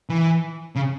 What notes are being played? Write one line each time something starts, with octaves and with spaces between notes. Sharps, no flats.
E3
C#3